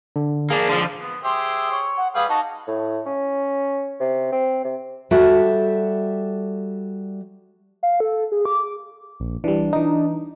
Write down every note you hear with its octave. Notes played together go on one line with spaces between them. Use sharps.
D3 D4
A#3 D4 G#4
D3 F3
B3
G4 G#4 C5 E5
C#5
F#5
G3 G#4 B4 F5
D#4 F#4 A5
A2
C#4
C3
C4
C3
G3 F#4 A4 E5
F5
A4
G#4
D6
A#1
E3 G3 D4
E3 D#4